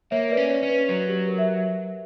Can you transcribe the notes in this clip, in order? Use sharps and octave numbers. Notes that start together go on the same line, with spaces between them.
A#3 C#5 E5
B4 D5
C#4
C#5
C#4
B4
F#3
G4
A#4
E5